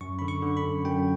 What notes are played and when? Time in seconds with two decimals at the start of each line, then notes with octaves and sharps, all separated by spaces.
0.01 F#2 C#6
0.19 D3 B5
0.28 C#6
0.42 D3
0.57 B5
0.64 F#2
0.85 F#2 G5